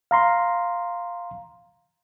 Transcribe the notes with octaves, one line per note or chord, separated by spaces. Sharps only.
F5 A#5 C6